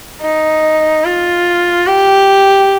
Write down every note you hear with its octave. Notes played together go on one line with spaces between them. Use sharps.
D#4
F4
G4